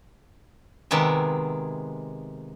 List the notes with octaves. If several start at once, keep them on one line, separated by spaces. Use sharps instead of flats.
C3 D#3 G#3 B3 E5